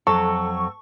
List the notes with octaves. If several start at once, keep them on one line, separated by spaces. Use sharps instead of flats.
F2 F#3 A4 C#6